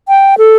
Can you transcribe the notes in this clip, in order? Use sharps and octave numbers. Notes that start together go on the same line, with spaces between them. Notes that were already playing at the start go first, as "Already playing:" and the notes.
G5
A4